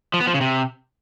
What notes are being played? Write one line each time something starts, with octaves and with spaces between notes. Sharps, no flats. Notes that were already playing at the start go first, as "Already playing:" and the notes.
F3
B3
F3
C#3
C3